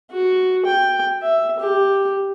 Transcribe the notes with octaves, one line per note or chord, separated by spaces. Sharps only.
F#4
G5
E5
G4